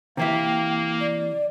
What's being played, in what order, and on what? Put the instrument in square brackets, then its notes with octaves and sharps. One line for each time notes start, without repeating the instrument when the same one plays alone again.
[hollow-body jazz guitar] C3 E3 E5 [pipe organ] A#3 [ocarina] G5
[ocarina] D5